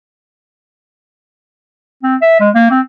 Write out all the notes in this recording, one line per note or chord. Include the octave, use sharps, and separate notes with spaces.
C4
E5
G#3
A#3
C4